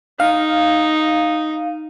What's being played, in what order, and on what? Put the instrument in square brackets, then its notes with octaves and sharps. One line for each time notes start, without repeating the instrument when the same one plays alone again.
[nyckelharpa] D#4 [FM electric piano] F5